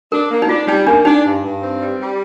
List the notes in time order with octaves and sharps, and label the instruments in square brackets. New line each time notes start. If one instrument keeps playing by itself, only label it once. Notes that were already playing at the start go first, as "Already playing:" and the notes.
[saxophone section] D4 [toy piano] A#4
[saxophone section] A#3
[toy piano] D#4
[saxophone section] D4 [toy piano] F4
[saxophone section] G3 [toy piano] D#4
[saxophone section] A#3 [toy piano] D4
[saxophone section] D4 [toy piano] D#4
[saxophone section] G2
G2
C4
G3
G3